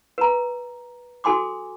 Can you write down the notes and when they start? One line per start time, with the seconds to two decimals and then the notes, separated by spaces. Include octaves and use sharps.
0.18 B4 A#5
1.24 F#4 A4 G#5 C6 D6